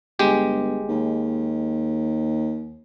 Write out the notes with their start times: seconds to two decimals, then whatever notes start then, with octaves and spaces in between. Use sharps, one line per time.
0.19 G1 G#3 G4
0.89 D#2